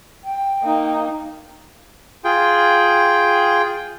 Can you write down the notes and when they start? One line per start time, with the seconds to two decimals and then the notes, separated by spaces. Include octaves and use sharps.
0.24 G5
0.63 A#3 D#4
2.25 F4 G#4 G5